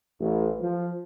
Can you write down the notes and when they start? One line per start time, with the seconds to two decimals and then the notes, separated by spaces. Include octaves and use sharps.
0.21 A1
0.60 F3